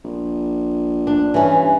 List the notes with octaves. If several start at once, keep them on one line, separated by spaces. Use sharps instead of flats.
A#1
D4
G2 E3 C#4